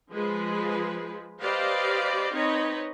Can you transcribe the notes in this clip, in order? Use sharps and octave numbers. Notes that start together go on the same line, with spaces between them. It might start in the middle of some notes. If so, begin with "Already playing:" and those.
F3 G#3 G#4 B4
G4 B4 C5 D5 D#5 F5
C4 D#4 B4 C#5 D#5